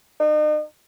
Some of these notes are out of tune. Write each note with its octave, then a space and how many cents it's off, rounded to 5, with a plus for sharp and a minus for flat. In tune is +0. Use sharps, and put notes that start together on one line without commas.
D#4 -40